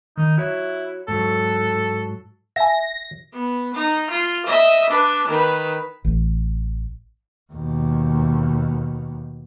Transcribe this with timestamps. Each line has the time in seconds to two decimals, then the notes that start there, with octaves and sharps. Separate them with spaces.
0.17 D#3 D#4
0.38 E4 F#4 C#5
1.08 G#2 F#3 A4
2.56 E5 G#5 A#6
3.33 B3
3.74 D#4
4.10 F4
4.46 D#5 E5
4.89 D4 B4
5.28 D#3 B4
6.04 A1
7.52 D#2 B2